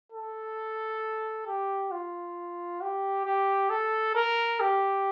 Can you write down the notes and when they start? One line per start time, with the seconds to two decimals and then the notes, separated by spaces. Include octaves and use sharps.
0.12 A4
1.47 G4
1.91 F4
2.81 G4
3.25 G4
3.70 A4
4.15 A#4
4.60 G4